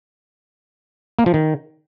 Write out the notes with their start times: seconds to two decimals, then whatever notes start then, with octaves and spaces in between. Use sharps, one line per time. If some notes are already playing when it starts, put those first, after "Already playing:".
1.19 A#3
1.26 F3
1.34 D#3